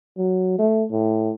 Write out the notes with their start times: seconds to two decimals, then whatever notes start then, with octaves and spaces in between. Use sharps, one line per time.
0.18 F#3
0.59 A3
0.92 A2